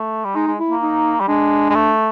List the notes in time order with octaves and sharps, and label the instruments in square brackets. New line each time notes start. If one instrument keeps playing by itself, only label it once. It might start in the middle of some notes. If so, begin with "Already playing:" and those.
Already playing: [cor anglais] A3
G3
[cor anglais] G#3 [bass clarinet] D#4
[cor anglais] G#3
[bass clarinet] E4
[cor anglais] A#3
[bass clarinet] D#4
[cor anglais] G3
[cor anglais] G#3 [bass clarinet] D4
[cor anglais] G#3
A3